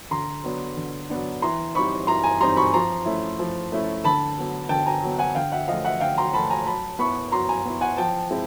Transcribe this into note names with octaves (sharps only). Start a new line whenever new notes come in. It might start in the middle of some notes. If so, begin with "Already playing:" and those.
D3 A#5 C6
F#3 B3 D4
D3
F#3 B3 D4
E3 A#5 C6
G3 C4 D#4 B5 C#6
E3 A#5 C6
G#5 A#5
G3 C4 D#4 A#5 C6
B5 C#6
F3 A#5 C6
A3 C#4 E4
F3
A3 C#4 E4
D3 A5 B5
F#3 B3
D3 G5 A5
G#5 A#5
F#3 B3
F#5 G#5
D3 F5 G5
E5 F#5
F3 A3 D#5 F5
E5 F#5
D3 F5 G5
A#5 C6
F3 A3 A5 B5
G#5 A#5
F#3 A5 B5
B3 E4 B5 C#6
F#3 A#5 C6
G#5 A#5
B3 E4
F#5 G#5
F3 G5 A5
G#3 C4 E4